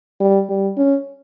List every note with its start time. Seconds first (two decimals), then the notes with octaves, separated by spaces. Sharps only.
0.20 G3
0.49 G3
0.77 C#4